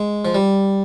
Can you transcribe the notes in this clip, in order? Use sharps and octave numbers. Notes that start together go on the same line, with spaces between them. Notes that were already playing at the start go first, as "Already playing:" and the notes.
Already playing: G#3
F3
G3